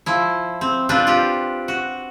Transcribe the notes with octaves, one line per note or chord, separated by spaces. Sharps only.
F3 E4
C4
C4 D4 F4 B4 C5
F4 G4
F#4